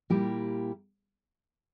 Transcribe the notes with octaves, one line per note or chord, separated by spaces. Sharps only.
A#2 G3 A#3 E4 G4